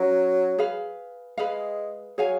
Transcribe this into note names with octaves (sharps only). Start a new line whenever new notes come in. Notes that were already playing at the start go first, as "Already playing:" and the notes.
Already playing: F#3 C#4 F#4 A#4
G#4 B4 F5
G#3 G#4 B4 F5
F#3 G#4 C#5 F5 G#5